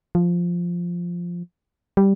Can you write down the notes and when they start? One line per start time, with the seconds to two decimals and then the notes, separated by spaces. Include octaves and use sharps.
0.15 F3
1.97 G3